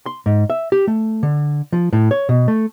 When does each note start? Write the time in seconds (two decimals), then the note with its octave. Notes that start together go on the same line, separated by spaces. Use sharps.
0.06 C6
0.26 G#2
0.50 E5
0.72 G4
0.87 A3
1.23 D3
1.72 F3
1.93 A2
2.11 C#5
2.29 B2
2.48 A3